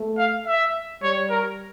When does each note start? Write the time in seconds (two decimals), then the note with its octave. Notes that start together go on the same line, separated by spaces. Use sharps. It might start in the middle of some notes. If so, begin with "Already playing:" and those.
Already playing: A3
0.18 F5
0.47 E5
1.02 G3 C#5
1.30 A#4